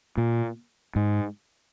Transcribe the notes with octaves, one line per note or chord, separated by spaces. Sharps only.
A#2
G#2